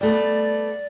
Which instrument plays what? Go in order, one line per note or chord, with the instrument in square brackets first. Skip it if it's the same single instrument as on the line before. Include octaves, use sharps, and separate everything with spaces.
[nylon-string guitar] G3 A3 B3 [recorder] D5